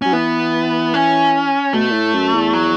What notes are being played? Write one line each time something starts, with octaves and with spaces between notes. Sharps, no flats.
F#3 C#4
E3 B3
C#4
B2 A3
A2
F#2
E2
F#3